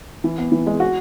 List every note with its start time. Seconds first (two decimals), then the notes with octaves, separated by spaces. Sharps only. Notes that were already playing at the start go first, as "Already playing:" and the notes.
0.24 E3
0.38 B3
0.52 E3
0.67 G#3
0.80 F#4